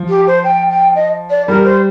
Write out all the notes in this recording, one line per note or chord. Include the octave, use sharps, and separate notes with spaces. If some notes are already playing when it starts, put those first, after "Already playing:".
Already playing: F3
G4
C5
G5
G5
D#5
D5
G3 A#4
C5